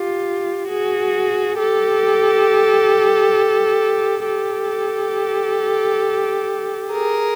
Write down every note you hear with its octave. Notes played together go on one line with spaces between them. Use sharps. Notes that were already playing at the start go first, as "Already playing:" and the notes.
Already playing: F4 G4
F#4 G#4
G4 A4
G4 A4
G#4 A#4